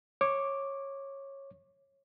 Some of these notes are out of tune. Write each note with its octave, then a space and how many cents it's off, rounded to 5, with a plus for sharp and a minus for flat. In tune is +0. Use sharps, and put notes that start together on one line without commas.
C#5 -15 D6 +0